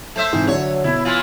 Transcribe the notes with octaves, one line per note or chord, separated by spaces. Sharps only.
A3 C5 E5
G#2 C3 E3
D3 F#3 C#5
B2 E4
E3 E4 F4